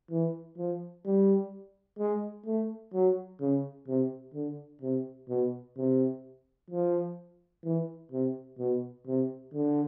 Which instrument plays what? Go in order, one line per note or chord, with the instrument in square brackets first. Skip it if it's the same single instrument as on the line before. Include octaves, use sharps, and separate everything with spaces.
[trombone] E3
F3
G3
G#3
A3
F#3
C#3
C3
D3
C3
B2
C3
F3
E3
C3
B2
C3
D3